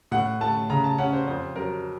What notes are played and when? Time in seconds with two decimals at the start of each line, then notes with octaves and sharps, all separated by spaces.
0.11 A2 F#5
0.40 A3 A5
0.70 C#3 A#5
0.84 A5
0.98 C#4 F#5
1.13 C5
1.27 F2 C5
1.56 F#3 A#4